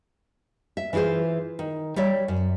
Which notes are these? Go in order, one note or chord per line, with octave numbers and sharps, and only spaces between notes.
E5
E3 E4 F4 G#4 C5
D#3
G3 C#5 D5 E5
F#2